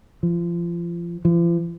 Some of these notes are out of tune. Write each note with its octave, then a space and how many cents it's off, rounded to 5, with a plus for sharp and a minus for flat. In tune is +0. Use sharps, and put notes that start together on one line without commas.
F3 -30
F3 -45